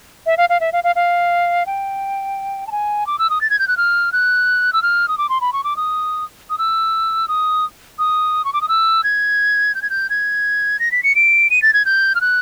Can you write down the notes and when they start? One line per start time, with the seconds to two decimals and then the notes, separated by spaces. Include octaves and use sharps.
0.26 E5
0.37 F5
0.49 F5
0.60 E5
0.72 F5
0.84 F5
0.95 F5
1.66 G5
2.67 A5
2.71 G#5
3.07 D6
3.19 E6
3.30 D#6
3.41 A6
3.50 G#6
3.59 G6
3.68 F#6
3.77 F6
4.12 F#6
4.73 E6
4.82 F6
5.08 D#6
5.18 D6
5.29 C6
5.41 B5
5.53 C#6
5.64 D6
5.77 D#6
6.50 D#6
6.58 E6
7.28 D#6
7.99 D#6
8.45 C#6
8.53 D6
8.61 D#6
8.69 E6
9.04 G#6
9.75 G6
9.82 G#6
9.90 G6
10.10 G#6
10.79 A#6
10.92 B6
11.03 C#7
11.15 D7
11.50 D#7
11.62 A6
11.73 G#6
11.85 G6
12.15 F6
12.21 F#6